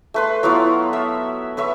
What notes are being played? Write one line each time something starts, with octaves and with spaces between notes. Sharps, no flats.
A3 B4 C6
F#3 B3 E4 F4
E5
B4 C#5 E5